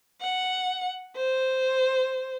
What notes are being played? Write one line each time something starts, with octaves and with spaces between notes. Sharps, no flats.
F#5
C5